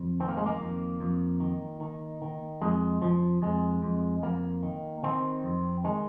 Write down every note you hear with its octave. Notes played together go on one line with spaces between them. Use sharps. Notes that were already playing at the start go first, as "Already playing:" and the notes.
Already playing: F2
D#3 C4
A#3
G#3
A#3
F2
F2
D#3
D#3
D#3
F2 G#3
F2 F3
F2 G#3
F2
F2 A#3
D#3
D#3 C4
F2
D#3 G#3